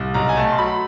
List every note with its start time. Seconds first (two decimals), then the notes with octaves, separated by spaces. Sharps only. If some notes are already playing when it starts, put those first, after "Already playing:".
Already playing: C2
0.14 B1 A#5
0.29 G#5
0.37 A3 A5
0.52 C6
0.58 F#3 B5